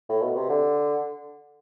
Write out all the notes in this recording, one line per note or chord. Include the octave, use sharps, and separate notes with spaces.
A2
B2
C3
D3